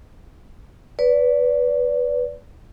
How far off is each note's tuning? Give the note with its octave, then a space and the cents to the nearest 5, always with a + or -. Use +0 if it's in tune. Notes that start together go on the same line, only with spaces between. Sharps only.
B4 +0 D5 -25